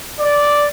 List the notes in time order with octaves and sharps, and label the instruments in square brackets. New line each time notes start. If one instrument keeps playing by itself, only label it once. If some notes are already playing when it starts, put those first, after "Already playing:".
[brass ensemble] D5